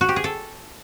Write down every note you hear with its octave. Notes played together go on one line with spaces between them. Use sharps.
F#4
G4
G#4
A4